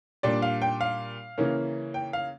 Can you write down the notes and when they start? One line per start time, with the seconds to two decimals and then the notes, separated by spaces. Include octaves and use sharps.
0.23 A#2 G3 D4 D5
0.42 F5
0.62 G5
0.81 F5
1.38 C#3 E3 A#3 C#4
1.94 G5
2.13 F5